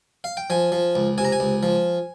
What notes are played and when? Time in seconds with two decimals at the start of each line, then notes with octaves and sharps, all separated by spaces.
0.24 F5
0.37 G5
0.50 F3 G#5
0.72 F3
0.95 C#2
1.18 C3 G#5
1.25 A#5
1.32 G#5
1.40 C#2
1.63 F3